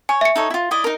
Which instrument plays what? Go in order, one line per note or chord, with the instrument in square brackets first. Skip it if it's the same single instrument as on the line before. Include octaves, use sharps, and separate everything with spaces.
[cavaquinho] C#5 [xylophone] G#5
[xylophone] E5 C#7
[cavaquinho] D#4 A4 C#5
E4 F4
E4 D5 D#5
D#4 A#4